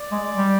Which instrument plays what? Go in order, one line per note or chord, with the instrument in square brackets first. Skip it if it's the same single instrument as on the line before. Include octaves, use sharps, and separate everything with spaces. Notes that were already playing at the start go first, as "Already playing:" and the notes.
Already playing: [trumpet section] D5
[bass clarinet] G#3
G3